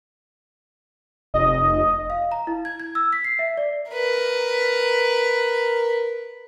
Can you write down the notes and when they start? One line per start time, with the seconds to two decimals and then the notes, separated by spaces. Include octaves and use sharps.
1.34 F1 D#5
2.10 F5
2.32 A#5
2.47 E4
2.65 G#6
2.80 G#6
2.95 E6
3.13 B6
3.24 C7
3.39 E5
3.57 D5
3.91 A#4 B4